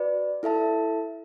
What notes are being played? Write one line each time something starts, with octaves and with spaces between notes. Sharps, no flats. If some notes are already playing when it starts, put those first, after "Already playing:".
Already playing: F#4 B4 D5
E4 A4 E5 A5